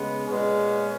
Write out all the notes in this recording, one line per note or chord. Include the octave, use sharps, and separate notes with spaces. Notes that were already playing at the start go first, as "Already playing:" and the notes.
Already playing: C#3 G#3 B3
A#2 G#3 B3 C#4